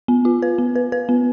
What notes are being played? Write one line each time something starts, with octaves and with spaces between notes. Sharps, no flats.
B3
F4
B4
B3
B4
B4
B3